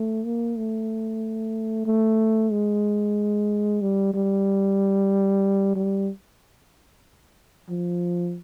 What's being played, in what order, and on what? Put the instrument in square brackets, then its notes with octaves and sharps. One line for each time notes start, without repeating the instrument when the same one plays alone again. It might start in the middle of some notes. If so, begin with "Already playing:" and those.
Already playing: [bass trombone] A3
A#3
A3
A3
G#3
G3
G3
G3
F3